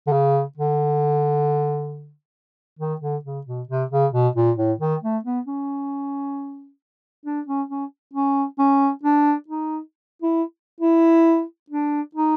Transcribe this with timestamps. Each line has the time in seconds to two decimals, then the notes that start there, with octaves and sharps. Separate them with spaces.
0.07 D3
0.12 C#3
0.57 D3
2.79 D#3
3.01 D3
3.25 C#3
3.47 B2
3.69 C3
3.91 C#3
4.13 B2
4.36 A#2
4.57 A2
4.80 D#3
5.02 A3
5.24 B3
5.47 C#4
7.25 D4
7.47 C#4
7.69 C#4
8.13 C#4
8.59 C#4
9.03 D4
9.48 D#4
10.22 E4
10.81 E4
11.70 D4
12.15 D#4